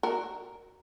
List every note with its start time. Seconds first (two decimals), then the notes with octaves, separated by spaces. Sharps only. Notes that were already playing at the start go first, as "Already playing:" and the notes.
0.03 F#4 A#4